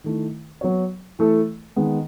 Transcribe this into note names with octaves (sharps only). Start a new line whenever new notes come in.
D#3 A3 E4
F#3 B3 F#4 C#5
E3 A3 E4 A4
D#3 G#3 B3